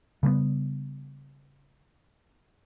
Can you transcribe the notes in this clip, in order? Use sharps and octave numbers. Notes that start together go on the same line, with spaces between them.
C#3 G3 A3 B3